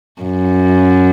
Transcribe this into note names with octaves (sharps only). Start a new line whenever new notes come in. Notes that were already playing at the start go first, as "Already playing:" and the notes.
F#2